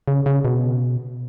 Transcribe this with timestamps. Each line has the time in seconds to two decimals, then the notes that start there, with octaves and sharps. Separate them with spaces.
0.08 C#3
0.26 C#3
0.45 B2